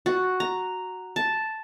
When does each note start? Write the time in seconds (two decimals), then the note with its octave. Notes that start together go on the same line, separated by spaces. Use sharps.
0.06 F#4
0.40 A#5
1.16 A5